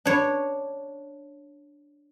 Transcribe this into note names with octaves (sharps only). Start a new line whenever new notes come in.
D4 C#5